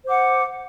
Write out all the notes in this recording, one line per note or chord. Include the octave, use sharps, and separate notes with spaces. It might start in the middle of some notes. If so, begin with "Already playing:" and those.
C5 F#5 D6